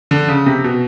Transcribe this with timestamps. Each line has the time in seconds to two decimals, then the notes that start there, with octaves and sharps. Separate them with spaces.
0.11 D3
0.28 C#3
0.46 C3
0.64 B2